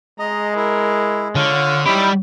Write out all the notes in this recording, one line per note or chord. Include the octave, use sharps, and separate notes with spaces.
G#3 D#5 A#5
E4 A#4
D3 F4 C#5
G3 D#4 E4 G4 B5